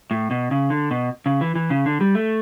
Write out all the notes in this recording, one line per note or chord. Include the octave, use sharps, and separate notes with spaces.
A2
B2
C#3
D3
B2
C#3
E3
E3
C#3
D3
G3
A3